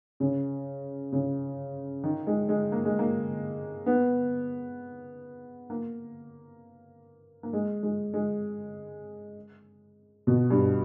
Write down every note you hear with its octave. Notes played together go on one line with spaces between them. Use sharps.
C#3
C#3
D#3
G#3
G#3
A#3
G#3
A#3
B3
A#3
A#3
G#3
G#3
G#3
B2
G2